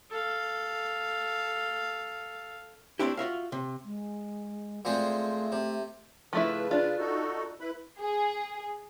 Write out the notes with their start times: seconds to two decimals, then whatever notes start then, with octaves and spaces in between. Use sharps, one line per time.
0.11 A4 F5
2.99 A3 A#3 C4 D4 E4 G4
3.17 F4 F#4 E5 F5
3.52 C3
3.84 G#3
4.85 A#2 G#3 A3 C4
5.52 C3
6.33 C#3 F3 A3 E4 B4
6.71 D4 F4
6.99 D#4 F#4 A4
7.60 E4 B4 B5
7.99 G#4